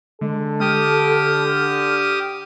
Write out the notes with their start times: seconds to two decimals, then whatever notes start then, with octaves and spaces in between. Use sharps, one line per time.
0.21 D3 G#3 A4
0.60 G4 D#6 F6